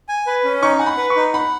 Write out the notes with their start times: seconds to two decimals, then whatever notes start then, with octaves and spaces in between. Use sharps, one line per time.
0.09 G#5
0.27 B4
0.44 C#4
0.63 D#4 C#6
0.79 F#5 G#5
0.86 B5
0.97 B4
1.10 C#6
1.16 D#4
1.33 F#5 B5